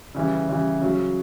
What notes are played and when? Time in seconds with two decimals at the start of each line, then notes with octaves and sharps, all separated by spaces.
0.15 C#3 E3 G3
0.49 C#3 E3 G3
0.82 C#3 F#3